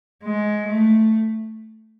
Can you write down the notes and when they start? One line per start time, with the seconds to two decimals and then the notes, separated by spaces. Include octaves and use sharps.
0.24 G#3
0.68 A3